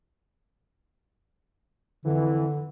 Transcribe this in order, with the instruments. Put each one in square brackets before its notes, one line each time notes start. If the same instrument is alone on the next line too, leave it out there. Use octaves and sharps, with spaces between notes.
[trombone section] F2 E3 [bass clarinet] D3